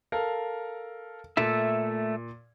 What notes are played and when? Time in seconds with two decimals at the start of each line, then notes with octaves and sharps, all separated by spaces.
0.12 A4 A#4 F5
1.37 A#2 A3 A4 E5